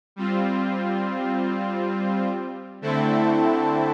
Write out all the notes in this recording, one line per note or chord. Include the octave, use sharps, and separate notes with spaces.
G3 C4 F4
D3 A3 C4 E4 A4